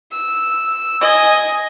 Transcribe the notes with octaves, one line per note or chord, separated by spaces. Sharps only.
E6
D#5 G#5